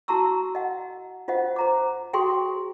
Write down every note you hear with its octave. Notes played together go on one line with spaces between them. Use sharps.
E4 F#4 A5 A#5 C#6 E6
D#5 F#5
F4 C5 D#5 F#5
C5 A#5 D6
F#4 G#4 G5 C6 C#6 D#6